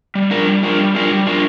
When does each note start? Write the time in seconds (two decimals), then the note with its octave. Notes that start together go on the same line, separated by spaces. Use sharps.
0.15 G3
0.31 D4 F4 A#4
0.47 G3
0.63 D4 F4 A#4
0.78 G3
0.95 D4 F4 A#4
1.11 G3
1.27 D4 F4 A#4